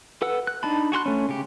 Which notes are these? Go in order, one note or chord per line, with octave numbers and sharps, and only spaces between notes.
A4 B4 F#5 E6
F#6
D4 D#4 A5 B5
F#4 G#4 C6 F#6
A3 C#4
C#3 G4